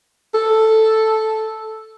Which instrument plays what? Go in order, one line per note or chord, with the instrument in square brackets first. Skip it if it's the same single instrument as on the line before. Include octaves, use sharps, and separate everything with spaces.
[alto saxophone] A4